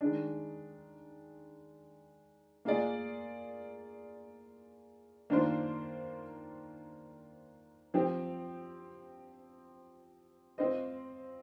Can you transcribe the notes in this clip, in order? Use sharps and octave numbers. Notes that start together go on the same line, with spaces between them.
D#3 G#3 D4
A#3 F4 G#4 D5
D#3 A#3 D4 F4 C5
F3 C4 G4
C4 F4 C5 D#5